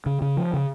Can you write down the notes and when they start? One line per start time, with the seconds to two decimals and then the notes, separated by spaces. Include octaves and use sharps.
0.06 C#3
0.22 C#3
0.37 F3
0.53 C#3